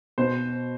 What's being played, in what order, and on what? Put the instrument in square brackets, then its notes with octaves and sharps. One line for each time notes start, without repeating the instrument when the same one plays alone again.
[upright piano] B2 C5